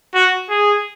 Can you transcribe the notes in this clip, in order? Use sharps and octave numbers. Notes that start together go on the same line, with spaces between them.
F#4
G#4